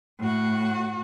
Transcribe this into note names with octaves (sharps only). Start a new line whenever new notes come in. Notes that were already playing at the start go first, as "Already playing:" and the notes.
A2 F#4